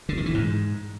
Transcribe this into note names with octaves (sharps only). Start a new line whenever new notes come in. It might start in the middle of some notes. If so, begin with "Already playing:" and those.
D3
D#3
E3
G#2